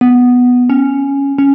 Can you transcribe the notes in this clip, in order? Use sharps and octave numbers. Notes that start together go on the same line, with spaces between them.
B3
C#4
C#4